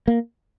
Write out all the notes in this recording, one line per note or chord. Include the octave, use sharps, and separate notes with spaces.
A#3